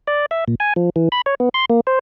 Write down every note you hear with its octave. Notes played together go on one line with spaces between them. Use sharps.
D5
E5
A#2
G#5
F3
E3
B5
C#5
B3
C6
A#3
C5